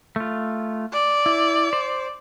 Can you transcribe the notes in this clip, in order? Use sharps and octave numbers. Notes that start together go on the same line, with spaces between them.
A3 F4
D5
E4
C5